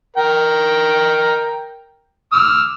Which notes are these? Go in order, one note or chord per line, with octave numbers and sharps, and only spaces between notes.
A#4 G5
D6 E6 F6